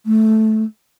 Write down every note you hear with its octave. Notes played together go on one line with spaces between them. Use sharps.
A3